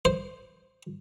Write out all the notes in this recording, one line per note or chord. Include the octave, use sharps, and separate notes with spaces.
C5